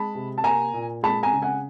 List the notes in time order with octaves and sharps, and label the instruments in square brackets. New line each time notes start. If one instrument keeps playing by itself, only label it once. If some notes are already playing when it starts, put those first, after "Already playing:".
Already playing: [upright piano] G#3 A5 B5
C3
A5
A#3 G#5 A#5
A#2
G#3 A5 B5
G#5 A#5
C#3
F#5 G#5